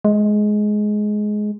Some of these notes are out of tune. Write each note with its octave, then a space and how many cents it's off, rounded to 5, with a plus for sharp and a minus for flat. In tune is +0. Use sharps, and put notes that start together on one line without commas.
G#3 +15